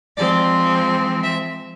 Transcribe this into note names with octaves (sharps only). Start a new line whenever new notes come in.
F3 G#3 C4 D5
E5